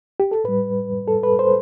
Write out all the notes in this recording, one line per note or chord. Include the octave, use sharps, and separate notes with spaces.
G4
A4
A2 G3 B4
A4
B4
C5